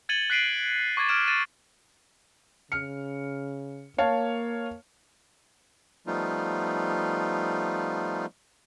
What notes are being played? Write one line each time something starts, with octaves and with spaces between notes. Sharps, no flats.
G#6 A6 C#7 D#7 F#7 G7
F#6 B6 C7 D7 D#7 F#7
C#6 D6 G#6 A6 D#7
D6 F6 G#6 D7 E7
A6 D#7 E7
C#3 F6 C#7
A#3 C#5 F5 A5
F3 G3 A3 B3 D#4 F4